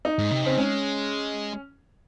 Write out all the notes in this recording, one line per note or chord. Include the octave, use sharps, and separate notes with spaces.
D#4
G#2
C3
C#3 C4
G#3 C#4